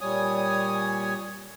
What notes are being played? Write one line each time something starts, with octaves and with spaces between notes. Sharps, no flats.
A#2 G3 C#5 G#5 D#6